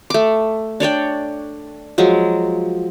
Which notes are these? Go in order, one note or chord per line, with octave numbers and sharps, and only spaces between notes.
A3 D6
D4 C#5 D5 G5
F3 F#3 G#3